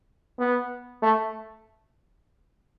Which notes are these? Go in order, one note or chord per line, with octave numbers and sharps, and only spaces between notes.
B3
A3